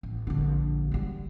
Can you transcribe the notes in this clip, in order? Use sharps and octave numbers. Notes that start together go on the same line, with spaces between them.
A1
A#1 D3
F#3 G3